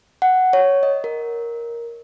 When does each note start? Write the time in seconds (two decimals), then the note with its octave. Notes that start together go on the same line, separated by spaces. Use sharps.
0.22 F#5
0.53 C#5
0.83 D#5
1.04 A#4